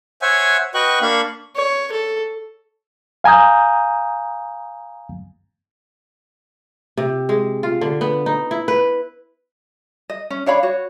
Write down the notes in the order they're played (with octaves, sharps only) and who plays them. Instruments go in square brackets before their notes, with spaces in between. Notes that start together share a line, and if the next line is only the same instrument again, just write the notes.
[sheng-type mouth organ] C5 C#5 E5 F#5 G#5
F#4 B4 D#5 G5 C#6 F#6
A#3 D4 F5 B5 C#6
[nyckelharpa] C#5
A4
[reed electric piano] F5 G#5 A#5 D#6 G6
[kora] C3
G#3
F4
D3
B3
D#4
E4
B4
[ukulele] D#5
C#4
D4 C#5 F5 B5
F#4 C#5